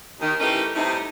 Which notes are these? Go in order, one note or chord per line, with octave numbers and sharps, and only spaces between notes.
D#2 D#3
E3 A3 C#4 D#4 G4 A#4
A2 C3 G3 A3 D#4